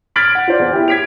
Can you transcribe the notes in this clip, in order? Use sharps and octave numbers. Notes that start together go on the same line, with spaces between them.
F6 G#6 A6 B6 D7 F#7
F#5
F4 C5 D5
E2
E4 G4
G#6 B6 D7 F7